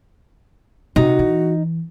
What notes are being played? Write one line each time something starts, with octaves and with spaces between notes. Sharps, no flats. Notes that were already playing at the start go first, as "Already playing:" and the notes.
C3 D#4 F#4
E3